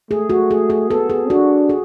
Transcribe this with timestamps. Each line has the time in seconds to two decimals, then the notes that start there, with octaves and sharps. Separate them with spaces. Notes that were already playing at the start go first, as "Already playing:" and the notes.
0.11 A3 G#4
0.30 F#4
0.51 G#4
0.70 G#4
0.90 B3 A4
1.10 G#4
1.29 D4 F#4
1.69 G#4